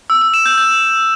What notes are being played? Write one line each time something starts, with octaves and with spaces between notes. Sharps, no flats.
E6
E6
E7
G6
G6